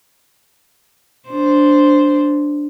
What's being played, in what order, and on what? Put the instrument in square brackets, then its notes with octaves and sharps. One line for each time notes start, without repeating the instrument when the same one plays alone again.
[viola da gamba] D4 C5